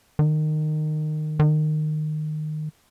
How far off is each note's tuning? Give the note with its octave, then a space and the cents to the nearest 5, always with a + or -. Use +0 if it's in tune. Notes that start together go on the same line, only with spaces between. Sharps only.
D#3 -20
D#3 -20